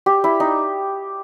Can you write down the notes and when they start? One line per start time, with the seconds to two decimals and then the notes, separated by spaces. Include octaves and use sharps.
0.06 G4
0.24 E4
0.40 D#4